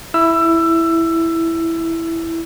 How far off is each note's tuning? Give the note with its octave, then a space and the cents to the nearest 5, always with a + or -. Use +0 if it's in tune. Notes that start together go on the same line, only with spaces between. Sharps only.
E4 +0 E6 +20